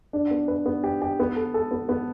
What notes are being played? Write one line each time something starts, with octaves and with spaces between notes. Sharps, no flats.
D4
B3
B4
B3
G4
G4
B3
A4
A4
B3
B3